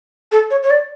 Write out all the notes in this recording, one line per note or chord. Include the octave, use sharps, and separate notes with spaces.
A4
C#5
C#5
D5